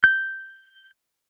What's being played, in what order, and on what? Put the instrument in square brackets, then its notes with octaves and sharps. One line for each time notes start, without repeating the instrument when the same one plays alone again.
[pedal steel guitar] G6